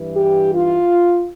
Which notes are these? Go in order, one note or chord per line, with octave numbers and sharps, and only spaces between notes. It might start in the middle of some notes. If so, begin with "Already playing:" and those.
Already playing: G2 E3
G4
F4